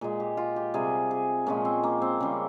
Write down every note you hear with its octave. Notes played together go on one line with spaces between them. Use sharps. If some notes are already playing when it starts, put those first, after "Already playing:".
A#2 G#3 G#4
G4
F4
G4
C3 G3 G#4
G#4
A#2 F3 G#3 C#4
C4
A#3
C4
C#3 G3